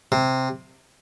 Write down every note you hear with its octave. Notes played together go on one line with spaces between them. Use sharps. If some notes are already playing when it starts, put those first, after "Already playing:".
C3